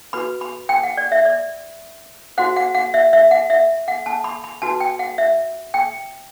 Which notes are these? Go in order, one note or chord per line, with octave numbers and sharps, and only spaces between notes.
F#4 B4 B5
B5
G5
F#5
D5
E5
D5
F#4 C5 F#5
F#5
F#5
E5
E5
F#5
E5
F#5
A5
B5
B5
F#4 B4 A5
G5
F#5
E5
G5